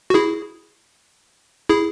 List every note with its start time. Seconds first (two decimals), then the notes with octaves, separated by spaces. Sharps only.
0.10 F#4
0.14 E4 G#4
1.69 E4 G#4